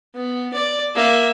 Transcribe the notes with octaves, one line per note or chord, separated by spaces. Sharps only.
B3
D5
A#3 E5